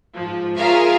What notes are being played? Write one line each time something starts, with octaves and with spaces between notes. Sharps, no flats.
G#2 F3
F4 G#4 A#4 C#5 E5 F5